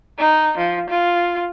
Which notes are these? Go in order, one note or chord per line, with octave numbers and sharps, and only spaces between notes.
D#4
F3
F4